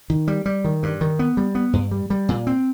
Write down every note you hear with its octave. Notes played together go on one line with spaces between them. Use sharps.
D#3
G3
G3
D#3
G2
D#3
B3
G3
B3
G2
G3
G3
A#2
C4